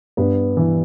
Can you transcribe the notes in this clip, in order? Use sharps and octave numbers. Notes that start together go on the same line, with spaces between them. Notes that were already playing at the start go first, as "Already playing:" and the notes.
G2 B3
E3